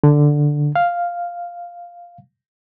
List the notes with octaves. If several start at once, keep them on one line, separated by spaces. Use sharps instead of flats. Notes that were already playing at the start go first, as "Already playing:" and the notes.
D3
F5